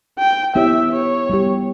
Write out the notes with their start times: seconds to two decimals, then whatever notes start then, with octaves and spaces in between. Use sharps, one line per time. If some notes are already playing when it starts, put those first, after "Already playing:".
0.19 G5
0.55 B3 E4 G4 C#5 E5
0.92 C#5
1.30 G3 B3 G4